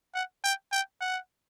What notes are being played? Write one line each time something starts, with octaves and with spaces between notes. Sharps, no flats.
F#5
G5
G5
F#5